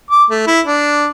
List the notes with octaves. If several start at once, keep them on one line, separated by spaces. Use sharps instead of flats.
D6
A3
E4
D4